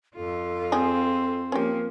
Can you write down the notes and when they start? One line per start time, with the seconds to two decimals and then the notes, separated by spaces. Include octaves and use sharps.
0.16 F2 F4 A4
0.72 G#3 C4 G#4 G5
1.52 F3 A#3 C#4 G4 A#4